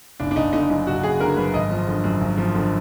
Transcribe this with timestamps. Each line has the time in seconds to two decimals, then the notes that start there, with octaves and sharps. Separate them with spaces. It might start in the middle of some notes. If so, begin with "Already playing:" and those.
0.20 F#1 D4
0.31 D4
0.36 F#1 D#4
0.53 D3 D#4
0.70 F#2 D#4
0.87 F#1 F#4
1.03 F#1 G#4
1.20 D3 A#4
1.37 F#2 B4
1.54 G#1 D#5
1.70 F3
1.87 D3
2.04 F#2
2.21 G#1
2.37 F3
2.55 D3